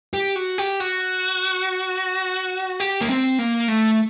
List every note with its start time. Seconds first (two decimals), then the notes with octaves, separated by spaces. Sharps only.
0.14 G4
0.36 F#4
0.58 G4
0.80 F#4
2.80 G4
3.01 A#3
3.09 C4
3.39 A#3
3.68 A3